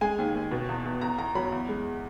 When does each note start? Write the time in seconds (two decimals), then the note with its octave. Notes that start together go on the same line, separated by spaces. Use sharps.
0.01 G#3 G#5
0.18 D#2
0.34 D#2
0.51 B2
0.69 E2
0.85 E2
1.01 E2 A#5
1.18 E2 A#5
1.35 F#3 B5
1.52 E2
1.69 G#3